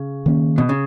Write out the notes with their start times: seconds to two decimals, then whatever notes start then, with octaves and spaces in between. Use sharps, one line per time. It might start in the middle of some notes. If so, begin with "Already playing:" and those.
Already playing: C#3
0.26 D#3 A#3 C#4
0.58 B2
0.69 C#3